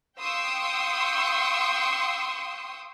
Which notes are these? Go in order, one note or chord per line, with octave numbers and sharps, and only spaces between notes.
F5 G5 C6 C#6 D#6 E6